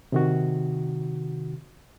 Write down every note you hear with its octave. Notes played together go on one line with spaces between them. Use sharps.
C3 D#3 F#4